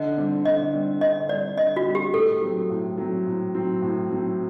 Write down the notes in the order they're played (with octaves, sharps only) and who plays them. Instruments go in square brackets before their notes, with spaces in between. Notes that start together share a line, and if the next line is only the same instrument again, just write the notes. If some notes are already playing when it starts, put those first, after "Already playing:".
Already playing: [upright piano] D3 [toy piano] D#5
[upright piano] G3 C4
[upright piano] D3 [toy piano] D#5
[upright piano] G3 C4
[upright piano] D3 [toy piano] D#5
[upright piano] G3 C4 [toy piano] D5
[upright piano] D3 [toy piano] D#5
[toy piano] F#4
[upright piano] G3 C4
[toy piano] G4
[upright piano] A2 [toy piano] A4
[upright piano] F#3 C4
A2
F#3 C4
A2
F#3 C4
A2
F#3 C4